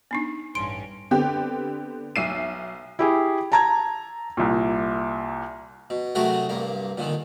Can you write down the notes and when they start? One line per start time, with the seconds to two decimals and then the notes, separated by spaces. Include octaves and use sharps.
0.11 B3 D4 D#4
0.55 A1 G2 C#4 C6 D7
1.11 D3 B3 C4 G4
2.16 B1 E5 C7 D#7
2.99 E4 G4 G#4
3.52 A5 A#5 G#6
4.37 C2 A#2
5.90 B2
6.15 C3 F#3 A3 F#4 G#4 A#4
6.49 C2 G2 A#3
6.98 A#2 D3 D#3